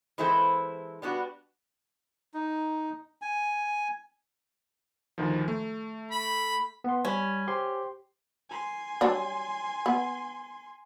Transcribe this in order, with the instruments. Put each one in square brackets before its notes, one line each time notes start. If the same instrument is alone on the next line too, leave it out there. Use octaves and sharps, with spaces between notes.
[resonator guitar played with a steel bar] E3 G#3 C4 E4 A4 C5
G3 B3 D4 F#4
[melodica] D#4
G#5
[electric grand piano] D2 D#3 F3
A3
[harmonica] B5
[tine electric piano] B3 C6
[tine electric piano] G3 B5 [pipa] C#4
[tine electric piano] G4 C5 C6
[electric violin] G#5 C6
[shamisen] F#3 G3 D4
B3